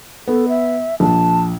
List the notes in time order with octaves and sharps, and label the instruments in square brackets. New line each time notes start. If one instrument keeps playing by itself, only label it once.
[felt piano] B3 [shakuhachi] A4
[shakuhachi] E5
[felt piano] A#1 [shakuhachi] A5